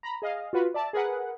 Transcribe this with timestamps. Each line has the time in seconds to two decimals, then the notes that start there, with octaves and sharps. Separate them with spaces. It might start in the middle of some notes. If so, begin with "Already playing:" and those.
0.03 A#5 B5
0.22 G#4 D#5 F5
0.53 F4 F#4 B4
0.74 D5 E5 A5
0.93 G#4 A#4 B4 F#5